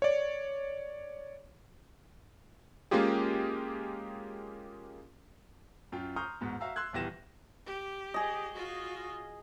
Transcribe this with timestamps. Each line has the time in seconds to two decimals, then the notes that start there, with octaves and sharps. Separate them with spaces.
0.02 C#5 D5
2.91 G#3 A#3 C#4 F4 G4 G#4
5.92 F#2 F4 G5
6.16 A#5 C6 C#6 D#6 F6 G6
6.41 E2 G#2 B2
6.61 F#4 E5 F5 A#5 E6
6.76 C6 E6 F#6 G#6
6.93 D#1 E2 E3 G4 A#6 E7
7.66 G4
8.14 G#4 D#5
8.54 F4 F#4